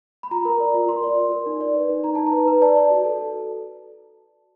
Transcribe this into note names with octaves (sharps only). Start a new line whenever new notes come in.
B5
F4 A#5
A#4
D5
F4
A#4 C6
D5
F4
A#4
D#4
D5
B4
D#4
D#4 A#5
D#4 A5
A#5
B4
B4
D5 A5
D5
F#4
A4